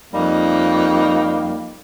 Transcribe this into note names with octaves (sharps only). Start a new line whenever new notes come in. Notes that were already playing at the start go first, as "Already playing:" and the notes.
F2 G3 A#3 D#4